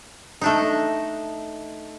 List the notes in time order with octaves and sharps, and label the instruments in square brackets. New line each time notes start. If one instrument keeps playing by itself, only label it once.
[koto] A3 D4 D#4